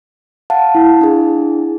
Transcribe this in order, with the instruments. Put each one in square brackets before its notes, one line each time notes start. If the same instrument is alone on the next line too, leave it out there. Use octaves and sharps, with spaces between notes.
[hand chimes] F5 F#5 A5
[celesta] E4
[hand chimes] D4 G#4